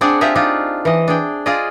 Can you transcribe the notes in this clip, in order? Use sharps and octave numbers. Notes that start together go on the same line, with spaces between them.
C4 D4 G#4 D5 F#5
C4 F4 G4 G#4 E5 A#5
D4 D#4 F4
E3 D#5
D4 G#4 G5
F4 G#4 D5 D#5